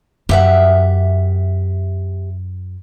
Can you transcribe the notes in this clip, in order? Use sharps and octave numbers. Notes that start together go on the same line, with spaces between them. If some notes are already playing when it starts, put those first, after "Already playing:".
F#2 G4 E5 F#5